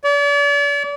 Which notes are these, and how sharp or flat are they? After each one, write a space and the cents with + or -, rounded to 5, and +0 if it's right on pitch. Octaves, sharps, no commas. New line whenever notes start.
D5 -40